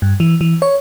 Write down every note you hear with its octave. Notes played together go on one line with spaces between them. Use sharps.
G2
E3
E3
C#5